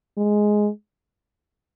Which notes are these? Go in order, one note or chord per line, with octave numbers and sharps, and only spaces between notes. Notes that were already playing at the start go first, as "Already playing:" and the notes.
G#3